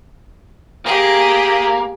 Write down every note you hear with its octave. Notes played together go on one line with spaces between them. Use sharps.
A#3 G4 G#4